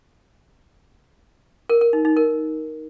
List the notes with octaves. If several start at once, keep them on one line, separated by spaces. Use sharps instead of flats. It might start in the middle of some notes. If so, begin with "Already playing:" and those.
A#4
A#4
D#4
D#4
A#4